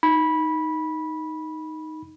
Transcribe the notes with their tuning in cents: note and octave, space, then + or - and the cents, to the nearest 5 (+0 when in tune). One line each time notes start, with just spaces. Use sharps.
D#4 +0 B5 -15